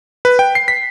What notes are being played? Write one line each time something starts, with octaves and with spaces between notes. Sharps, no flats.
B4
G5
C7
B6